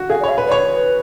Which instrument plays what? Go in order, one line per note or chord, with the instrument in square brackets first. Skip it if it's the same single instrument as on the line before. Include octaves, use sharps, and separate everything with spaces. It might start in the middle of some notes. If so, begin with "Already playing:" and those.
Already playing: [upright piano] F#4
[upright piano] G#4 [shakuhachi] F5
[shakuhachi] D5
[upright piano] C#5
[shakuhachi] F5
[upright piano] B4
[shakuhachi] D5
[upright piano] C#5
[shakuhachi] B4